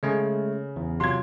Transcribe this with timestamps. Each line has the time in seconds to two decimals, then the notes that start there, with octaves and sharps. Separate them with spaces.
0.03 C#3 G#3 A3 C#4
0.76 E2
1.00 C3 F#3 F4 C6 G#6